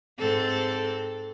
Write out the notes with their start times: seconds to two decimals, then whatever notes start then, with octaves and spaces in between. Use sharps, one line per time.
0.19 G#2 C4 A4